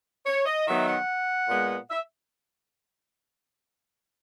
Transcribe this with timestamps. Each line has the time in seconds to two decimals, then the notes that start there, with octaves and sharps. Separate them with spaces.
0.26 C#5
0.46 D#5
0.67 D#3 F#3 B3 D#4 E5
0.87 F#5
1.49 A#2 G#3 B3
1.90 E5